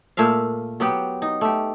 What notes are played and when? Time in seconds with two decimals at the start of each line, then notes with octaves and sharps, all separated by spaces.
0.17 A#2 A3 E5 F5
0.80 F#3 B3 G4
1.22 D#4
1.41 A3 G4